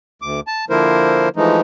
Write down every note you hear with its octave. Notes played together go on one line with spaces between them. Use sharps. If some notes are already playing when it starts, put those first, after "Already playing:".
D2 D6
A5
D3 F3 A#3 E4 A#4 C5
E3 F3 G#3 A3 D#4